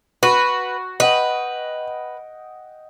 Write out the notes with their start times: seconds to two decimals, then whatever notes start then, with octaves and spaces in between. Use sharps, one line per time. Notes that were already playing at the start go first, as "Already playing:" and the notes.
0.23 F#4 B4
1.00 B4 D#5 F#5 G5